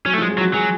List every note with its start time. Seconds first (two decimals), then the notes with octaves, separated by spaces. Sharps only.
0.05 F#3 C#4
0.13 A3
0.18 F3 G#3
0.30 G#3
0.38 F#3
0.41 F#4
0.54 F#3 G#4